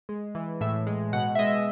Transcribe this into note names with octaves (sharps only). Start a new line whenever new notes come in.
G#3
E3
A2 E5
G#3
B2 F#5
E5
G#3 D#5